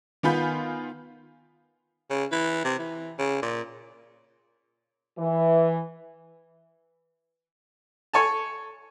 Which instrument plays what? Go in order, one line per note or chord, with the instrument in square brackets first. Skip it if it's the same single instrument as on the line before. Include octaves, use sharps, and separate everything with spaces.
[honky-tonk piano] D#3 B3 F4 G#5 B5 G6
[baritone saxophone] C#3
E3
C3
E3
C#3
A#2
[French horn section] E3
[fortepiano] A4 C#5 G#5 A5